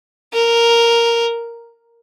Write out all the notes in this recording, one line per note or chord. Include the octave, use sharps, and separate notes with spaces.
A#4